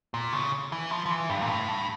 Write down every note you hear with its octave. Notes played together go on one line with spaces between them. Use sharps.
A#2
C#3
E3
F3
F3
E3
G2
A#2
A2
G2